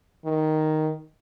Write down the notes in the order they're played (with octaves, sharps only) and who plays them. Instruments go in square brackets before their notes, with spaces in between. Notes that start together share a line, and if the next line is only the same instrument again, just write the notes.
[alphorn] D#3